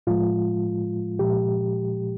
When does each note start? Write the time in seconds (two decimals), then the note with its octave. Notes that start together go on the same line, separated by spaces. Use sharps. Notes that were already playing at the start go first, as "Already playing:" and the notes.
0.07 A2 F3 G#3 F4
1.19 A#2 F3 G#3 G4